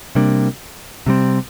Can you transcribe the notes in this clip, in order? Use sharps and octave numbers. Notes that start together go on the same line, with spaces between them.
C3 G3 A#3 D4
C3 G3 C4